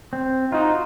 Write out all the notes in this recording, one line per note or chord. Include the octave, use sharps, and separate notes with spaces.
C4
D#4 F4 F#4